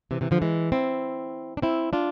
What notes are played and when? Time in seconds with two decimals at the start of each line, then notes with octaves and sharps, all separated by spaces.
0.11 C3 E3
0.21 C3 E3
0.31 D3 F3
0.42 E3 G#3
0.72 C4 E4
1.57 D4
1.62 C4 E4
1.93 D4 F4